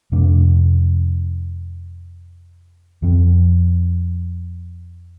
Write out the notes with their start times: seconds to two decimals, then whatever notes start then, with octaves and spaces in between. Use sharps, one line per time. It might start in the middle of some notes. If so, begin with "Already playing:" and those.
0.12 F2 C3 A3 D4
3.02 F2 F3 C4